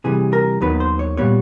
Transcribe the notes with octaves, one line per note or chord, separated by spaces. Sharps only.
C3 E3 G3 G#4
A#4
D#2 D#3 F#3 B3 B4
C5
C#5
A#2 G3 B3 C#5